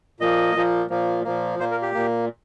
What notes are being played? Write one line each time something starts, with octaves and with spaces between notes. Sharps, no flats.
A#2 F3 A#3 D#5
A#2 F3 A#3
A#2 F3 A#3
A#2 F3 A#3
A#2 A#3 C5
A#4
G4
A#2 A#3